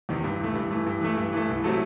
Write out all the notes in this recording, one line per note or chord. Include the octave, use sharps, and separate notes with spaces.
E2 C3 D#3
G2
E3 A3
G2
E3 A3
G2
E3 A3
G2
E3 A3
C2
C3 F#3 A3